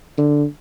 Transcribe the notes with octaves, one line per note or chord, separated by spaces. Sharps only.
D3